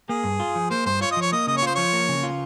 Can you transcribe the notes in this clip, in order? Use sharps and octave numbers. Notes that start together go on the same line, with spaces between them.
A#3 G#4
G2
F4
F3
A#3 C5
G2 C5
F4 C#5
D#5
F3 C#5
A#3 D#5
C#3 D#5
C#5
F4 C5
F3 C#5
A#3
C#3
F4